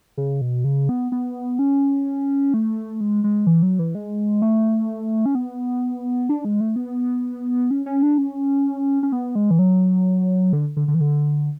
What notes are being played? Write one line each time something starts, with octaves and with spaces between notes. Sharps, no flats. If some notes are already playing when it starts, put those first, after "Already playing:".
C#3
B2
C#3
B3
B3
C#4
A3
G#3
G#3
E3
F#3
E3
G#3
A3
C#4
B3
D4
G#3
A3
B3
C#4
C#4
D4
C#4
C#4
B3
G#3
E3
F#3
D3
D3
D3
E3
D3